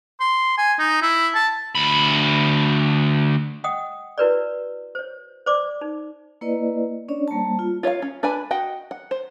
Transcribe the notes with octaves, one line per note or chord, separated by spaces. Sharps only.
C6
G#5
D#4
E4
A5
D2 B5
D#5 F#5 G5 D#6
E4 F#4 A#4 B4 C#5 D5
C5 C#5
C5 D5 D6
D#4
A#3 E4 B4 D5 D#5
C#4 D4 C#5 D5
G3 A#3 C5 A5
F4
F4 C#5 E5 F5
C#4
D4 B4 D5 G#5 B5
F#4 D#5 F#5 G5
F#5
C5